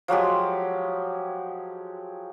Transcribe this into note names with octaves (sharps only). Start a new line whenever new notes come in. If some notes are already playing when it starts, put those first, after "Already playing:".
F3 F#3 G#3 G4